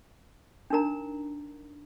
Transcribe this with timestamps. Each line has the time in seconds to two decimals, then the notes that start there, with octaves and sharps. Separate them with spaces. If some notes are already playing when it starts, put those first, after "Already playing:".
0.70 D4 D#4 A#4 A#5